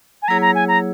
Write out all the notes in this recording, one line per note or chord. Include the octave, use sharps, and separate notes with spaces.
G#5
F#3 A#3 E4 G#4 C#5 A#5
A#5
G#5
A#5